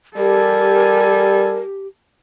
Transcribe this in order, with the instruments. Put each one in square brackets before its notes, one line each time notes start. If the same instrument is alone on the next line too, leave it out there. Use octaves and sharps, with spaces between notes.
[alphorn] G3 [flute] G4 [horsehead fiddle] A4 G#5 [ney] A#4